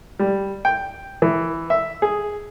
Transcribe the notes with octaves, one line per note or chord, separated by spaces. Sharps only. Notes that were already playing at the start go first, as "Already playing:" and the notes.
G3
G5
E3
E5
G#4